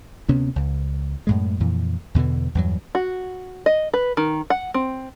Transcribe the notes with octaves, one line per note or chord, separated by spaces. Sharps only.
D2 C3 B3 C#4
C#2
F#2 A2 G#3
F2 A#2 E3
E2 B2 D3 E3
E2 G2 F#3
F#4
D#5
B4
D#3
F#5
C4